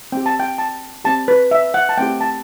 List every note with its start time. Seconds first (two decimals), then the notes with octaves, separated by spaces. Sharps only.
0.12 C4 G4 G5
0.26 A5
0.40 G5
0.58 A5
1.04 C4 G4 A5
1.28 B4
1.51 E5
1.74 F#5
1.89 A5
1.97 A3 C4 E4 G4 G5
2.21 A5